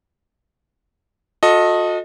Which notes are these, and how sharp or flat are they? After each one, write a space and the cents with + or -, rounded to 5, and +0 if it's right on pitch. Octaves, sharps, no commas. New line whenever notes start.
F#4 -45 A4 +5 D#5 +0